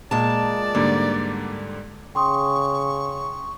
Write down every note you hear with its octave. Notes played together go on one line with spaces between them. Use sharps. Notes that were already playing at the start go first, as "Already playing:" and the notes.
A#2 G#3 D5 A5
G#2 D3 G3 A#3
C#3 G5 C6 C#6 D#6